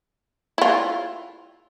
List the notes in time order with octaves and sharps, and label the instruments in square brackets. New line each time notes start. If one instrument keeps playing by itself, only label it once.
[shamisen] E4 F4